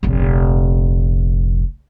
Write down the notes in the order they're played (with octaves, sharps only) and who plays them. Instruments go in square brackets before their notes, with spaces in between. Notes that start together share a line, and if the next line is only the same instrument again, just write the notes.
[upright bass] F1 A#1